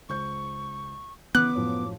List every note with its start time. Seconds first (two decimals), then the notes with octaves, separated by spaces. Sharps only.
0.09 C#2 C5 C#6 G6
1.35 C#3 E3 B3 B4 D6 F#6
1.55 F#2 A2 F3